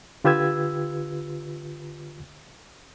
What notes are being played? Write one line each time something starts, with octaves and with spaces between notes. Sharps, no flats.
D3 F4 G4 B4 E6 G#6